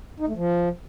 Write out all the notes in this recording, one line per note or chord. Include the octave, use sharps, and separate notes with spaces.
D#4
A3
F3